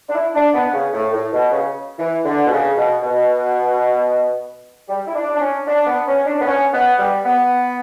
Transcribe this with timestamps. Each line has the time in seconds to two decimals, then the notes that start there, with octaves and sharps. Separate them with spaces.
0.09 D4
0.14 E4
0.35 D4
0.54 B3
0.73 C#3
0.94 A2
1.13 A2
1.33 B2
1.52 C#3
1.98 E3
2.25 D3
2.47 B2
2.52 C#3
2.78 B2
3.04 B2
4.88 G3
5.06 E4
5.15 D4
5.34 D4
5.41 C#4
5.67 D4
5.87 B3
6.07 C#4
6.26 D4
6.41 B3
6.47 C#4
6.73 B3
6.99 G3
7.26 B3